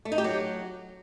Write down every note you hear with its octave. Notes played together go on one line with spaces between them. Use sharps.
A3
D#4
G4
F#3